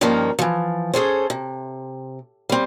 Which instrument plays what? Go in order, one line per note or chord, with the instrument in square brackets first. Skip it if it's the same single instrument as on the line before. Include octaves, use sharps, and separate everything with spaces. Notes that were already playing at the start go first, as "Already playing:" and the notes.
[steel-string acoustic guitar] G2 D#3 F3 A#3 C#4 A#5
E3 F3
C#4 G#4 A4 C5
C3
G3 C4